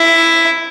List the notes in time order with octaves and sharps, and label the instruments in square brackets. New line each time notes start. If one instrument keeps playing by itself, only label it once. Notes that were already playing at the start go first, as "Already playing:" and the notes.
Already playing: [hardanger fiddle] E4